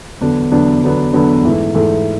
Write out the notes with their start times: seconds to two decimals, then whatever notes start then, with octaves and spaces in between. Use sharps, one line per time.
0.21 E2 D3 F#3 B3 D4
0.52 E2 D3 F#3 B3 D4
0.82 E2 D3 F#3 B3 D4
1.13 E2 D3 F#3 B3 D4
1.43 G#2 E3 A3
1.75 G#2 E3 A3